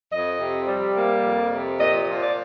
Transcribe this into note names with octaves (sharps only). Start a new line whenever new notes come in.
F2 D#5
C3
G3
A#3
F2
C3
A#2 D#5
F3
D5